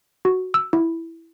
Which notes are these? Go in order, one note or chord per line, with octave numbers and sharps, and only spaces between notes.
F#4
E6
E4